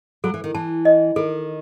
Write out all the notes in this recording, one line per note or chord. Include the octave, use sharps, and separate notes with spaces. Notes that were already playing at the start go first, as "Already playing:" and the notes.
F#3 A4
E3
D#3
E3 A5
D#5
D#3 A4